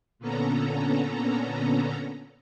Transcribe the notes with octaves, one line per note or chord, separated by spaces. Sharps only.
A#2 D3 B3 C#4 A4 A#5